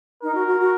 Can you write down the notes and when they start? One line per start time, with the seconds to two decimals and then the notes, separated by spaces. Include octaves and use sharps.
0.23 D#4 A#4
0.35 F#4
0.47 F#4
0.60 F#4